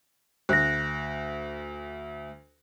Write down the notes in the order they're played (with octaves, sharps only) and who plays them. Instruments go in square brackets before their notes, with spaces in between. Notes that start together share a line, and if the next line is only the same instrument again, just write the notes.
[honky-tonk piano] D2 [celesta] F#6 A#6